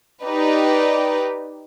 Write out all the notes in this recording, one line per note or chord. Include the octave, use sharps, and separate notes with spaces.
D#4 G4 B4 D5